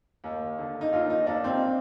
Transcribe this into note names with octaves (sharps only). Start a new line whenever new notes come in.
D#2
D3
D#4
D#2 F4
D#4
D#2 D4
C4